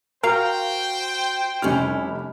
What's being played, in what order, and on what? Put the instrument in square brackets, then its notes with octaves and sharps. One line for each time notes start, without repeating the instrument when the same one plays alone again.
[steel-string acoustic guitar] F#4 A#5 [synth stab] A#4 F5 [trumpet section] C5 G5
[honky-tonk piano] F1 G3 F6 [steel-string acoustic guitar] C#4 E4 G4